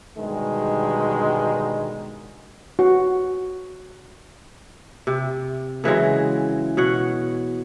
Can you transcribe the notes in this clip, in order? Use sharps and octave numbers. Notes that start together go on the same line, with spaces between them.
G2 B2 D3 D#3 G3 G#3
F#4
C3
C#3 E3 F#3 G#3
B2 C#5 F#5